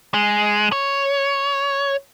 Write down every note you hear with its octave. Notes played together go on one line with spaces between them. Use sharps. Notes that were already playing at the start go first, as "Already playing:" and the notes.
G#3
C#5